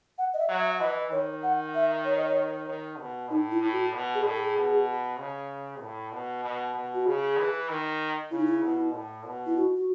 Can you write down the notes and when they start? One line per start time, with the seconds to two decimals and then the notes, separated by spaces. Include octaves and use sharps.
0.18 F#5
0.34 D#5
0.39 E5
0.49 F#3
0.59 E5
0.80 E3 D#5
1.11 D#3 C#5
1.43 F#5
1.75 E5
2.05 C#5
2.17 D#5
2.28 C#5
2.69 D#3
2.99 B2
3.30 A2 D#4
3.51 E4
3.62 A2
3.72 F#4
3.94 B2
4.15 G#4
4.25 A2
4.30 A4
4.36 G#4
4.57 B2
5.19 C#3
5.81 A2
6.12 B2
6.44 B2
6.75 B2
6.94 F#4
7.07 C#3 G#4
7.38 E3
7.69 D#3
8.31 C#3 E4
8.38 D#4
8.46 E4
8.63 B2
8.94 A2
9.25 B2
9.46 E4
9.57 F#4
9.77 F#4